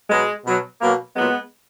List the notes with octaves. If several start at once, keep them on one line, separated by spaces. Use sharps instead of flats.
B2 F#3 G#3
B2 F#3
B2 F#3 A#3
A#2 F#3 G#3 B3